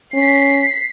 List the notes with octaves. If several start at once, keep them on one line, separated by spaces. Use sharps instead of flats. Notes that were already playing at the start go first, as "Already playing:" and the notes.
C#4 B6 C7